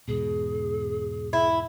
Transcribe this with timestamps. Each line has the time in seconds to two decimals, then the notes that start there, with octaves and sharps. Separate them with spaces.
0.08 E2 G#2 B2 G#4
1.33 E4